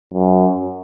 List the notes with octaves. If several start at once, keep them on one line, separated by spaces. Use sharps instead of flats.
F#2